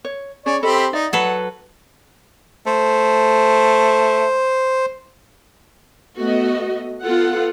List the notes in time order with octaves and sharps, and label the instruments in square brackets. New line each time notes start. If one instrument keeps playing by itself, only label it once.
[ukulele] C#5
[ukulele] C#4 G#4 [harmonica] C#5 D5
[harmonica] C4 G4 B5 [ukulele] A4 D#5
[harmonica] D#4 [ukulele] D5 E5
[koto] F#3 A4 B4 [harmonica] F#5
[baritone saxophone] A3 [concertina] C5
[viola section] A3 B3 F#4 D#5
B3 F4 A4 F#5